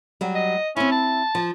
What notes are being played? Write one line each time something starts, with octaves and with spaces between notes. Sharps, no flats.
F#3 G3
D#5
C4 C#4 E4
A5
F3